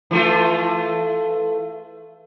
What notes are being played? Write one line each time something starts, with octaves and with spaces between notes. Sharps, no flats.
E3 A3 F4